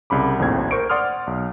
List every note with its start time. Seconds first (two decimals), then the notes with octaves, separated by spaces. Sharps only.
0.10 C2 C#3 B5 D6
0.39 A#1 D#2 A2 C4 G#6
0.71 A#4 C5 C#6 C#7 D7
0.90 D5 F#5 C6 D#6 F6
1.27 B1